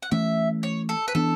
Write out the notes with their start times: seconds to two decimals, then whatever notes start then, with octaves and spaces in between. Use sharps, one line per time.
0.03 F#5
0.11 E3 A3 C#4 E5
0.63 C#5
0.89 A4
1.08 B4
1.15 E3 B3 D4 A4